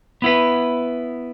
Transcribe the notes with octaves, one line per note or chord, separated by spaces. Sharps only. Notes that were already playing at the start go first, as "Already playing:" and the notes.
B3 E4 B4